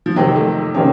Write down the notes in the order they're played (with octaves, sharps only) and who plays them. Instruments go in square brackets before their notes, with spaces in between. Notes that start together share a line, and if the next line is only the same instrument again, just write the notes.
[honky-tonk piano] F3
[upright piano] F2 C3 D#3 A#3 [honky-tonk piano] F#3
[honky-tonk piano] A3
[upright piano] C3 D#3 A#3 [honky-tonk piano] C#4